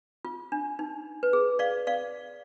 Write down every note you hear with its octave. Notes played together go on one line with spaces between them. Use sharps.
F4
D4
D#4
B4
G#4
D5 F5
D5 F5